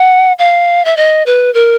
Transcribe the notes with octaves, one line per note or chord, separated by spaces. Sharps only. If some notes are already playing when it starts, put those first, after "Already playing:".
Already playing: F#5
F5
E5
D#5
B4
A#4